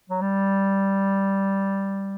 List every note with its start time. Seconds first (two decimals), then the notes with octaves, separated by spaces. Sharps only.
0.10 F#3
0.21 G3